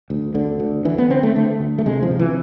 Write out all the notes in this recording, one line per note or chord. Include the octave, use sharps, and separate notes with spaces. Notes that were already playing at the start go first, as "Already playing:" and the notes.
D2
D2 D3
D2
D3 E3
B3
D3 C4
A3
D3 A3
D2
A3
C3 G#3
F3
C3
E3